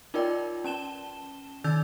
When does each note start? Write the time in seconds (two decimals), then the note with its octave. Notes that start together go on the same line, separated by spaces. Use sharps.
0.14 D#4 F4 A#4 D5 G5
0.64 C#4 A5 E7 G7
1.64 D#3 D#4 E6 G6 A6 F7